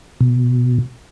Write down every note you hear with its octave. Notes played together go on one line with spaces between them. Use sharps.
B2